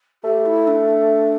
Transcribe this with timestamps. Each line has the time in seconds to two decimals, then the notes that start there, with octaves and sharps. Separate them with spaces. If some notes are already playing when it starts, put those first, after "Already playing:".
0.24 A3 G4
0.46 E4
0.67 D4